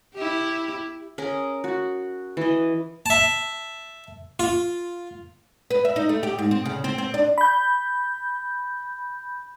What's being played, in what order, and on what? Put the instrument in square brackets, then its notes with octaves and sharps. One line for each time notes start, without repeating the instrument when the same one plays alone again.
[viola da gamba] E4 G4
[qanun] C#4 G#4 A#4
F#4
E3 D#5
[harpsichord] E5 A5
F4
[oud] B4
E5
D#4
A3
G4
G#2
C4
C#3
C4
C4
D4
[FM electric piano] B5 G6